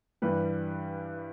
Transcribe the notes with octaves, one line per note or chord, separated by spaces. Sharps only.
G2 E3 G3 B4